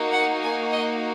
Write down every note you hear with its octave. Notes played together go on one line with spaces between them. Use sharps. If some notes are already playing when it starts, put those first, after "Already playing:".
Already playing: A#3 D#4 F#4
F#5
G#5
D#5